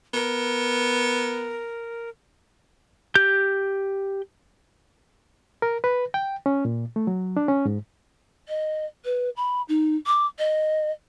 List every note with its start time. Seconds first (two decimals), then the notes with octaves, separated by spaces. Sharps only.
0.14 B3 A#4
3.15 G4 G6
5.62 A#4
5.84 B4
6.14 G5
6.46 C#4
6.65 A#2
6.96 A3
7.07 F#3
7.37 D4
7.48 C#4
7.66 G#2
8.49 D#5
9.05 B4
9.37 B5
9.69 D#4
10.07 D6
10.39 D#5